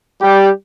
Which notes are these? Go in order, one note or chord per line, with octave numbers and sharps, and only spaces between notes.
G3 G4